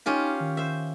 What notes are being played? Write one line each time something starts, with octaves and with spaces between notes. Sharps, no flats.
C#4 D#4 F4 G4
D#3
C5 E5